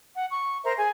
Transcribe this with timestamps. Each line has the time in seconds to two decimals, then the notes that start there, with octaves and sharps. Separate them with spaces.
0.14 F#5
0.29 C#6
0.64 A#4 C5 E5 A#5
0.77 G#4 G#5